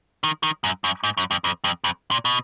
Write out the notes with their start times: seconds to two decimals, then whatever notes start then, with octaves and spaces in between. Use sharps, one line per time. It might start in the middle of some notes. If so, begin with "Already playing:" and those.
0.24 D#3
0.43 D#3
0.64 F#2
0.84 F#2
1.04 G#2
1.17 F#2
1.31 F2
1.44 F2
1.64 F2
1.84 F2
2.11 A#2
2.25 B2